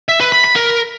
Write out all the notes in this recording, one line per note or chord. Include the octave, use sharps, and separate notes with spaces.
E5
B4
B5
B5
A#4